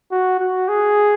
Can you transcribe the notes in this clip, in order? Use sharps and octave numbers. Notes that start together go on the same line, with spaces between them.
F#4
F#4
G#4